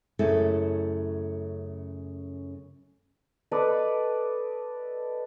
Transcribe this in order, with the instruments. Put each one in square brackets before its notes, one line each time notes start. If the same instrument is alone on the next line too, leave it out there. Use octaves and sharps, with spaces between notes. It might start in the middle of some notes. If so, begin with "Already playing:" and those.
[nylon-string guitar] F#2 C#3 A3 E4 A4
[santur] A4 B4 D5 D#5